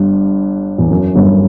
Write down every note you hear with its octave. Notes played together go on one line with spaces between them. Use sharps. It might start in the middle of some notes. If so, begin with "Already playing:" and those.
Already playing: G1 G2
E2
F#2
G1 G2